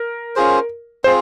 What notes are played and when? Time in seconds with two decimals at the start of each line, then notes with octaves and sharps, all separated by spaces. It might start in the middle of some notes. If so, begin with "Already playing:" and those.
Already playing: A#4
0.36 C#4 F4 G#4 C5
1.04 C4 F4 G#4 C5